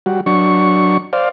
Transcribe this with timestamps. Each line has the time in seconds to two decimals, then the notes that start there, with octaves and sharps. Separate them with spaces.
0.06 G3 F#4
0.26 F#3 D4 C#6
1.13 C5 D5 F5